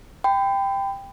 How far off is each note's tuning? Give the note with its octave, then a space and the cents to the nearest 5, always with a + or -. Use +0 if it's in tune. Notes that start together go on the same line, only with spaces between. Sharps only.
G5 +10 B5 +35